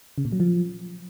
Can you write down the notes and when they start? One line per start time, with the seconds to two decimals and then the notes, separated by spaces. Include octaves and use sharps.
0.18 C#3
0.25 A#2
0.32 F#3
0.40 F3